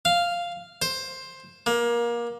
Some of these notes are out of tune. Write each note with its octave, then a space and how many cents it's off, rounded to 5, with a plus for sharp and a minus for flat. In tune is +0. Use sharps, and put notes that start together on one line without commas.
F5 -5
C5 +10
A#3 +25